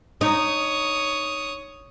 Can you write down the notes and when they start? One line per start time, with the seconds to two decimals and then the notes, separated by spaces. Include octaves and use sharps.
0.21 D#4 C#5 D#6